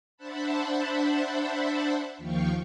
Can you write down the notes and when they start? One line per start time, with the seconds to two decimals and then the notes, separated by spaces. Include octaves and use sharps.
0.17 D4 C5 E5 F#5 A5 B5
2.18 D#2 F3 F5 G5 C#6